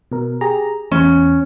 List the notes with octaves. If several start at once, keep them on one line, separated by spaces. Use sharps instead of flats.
B2 A#4
G4 G#4 A#5
E2 C#4